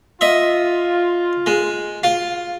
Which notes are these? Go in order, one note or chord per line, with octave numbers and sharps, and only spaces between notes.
F4 D#5 E5
G#3
F4